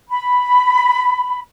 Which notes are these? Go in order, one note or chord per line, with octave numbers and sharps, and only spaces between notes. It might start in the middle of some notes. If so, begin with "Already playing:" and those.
B5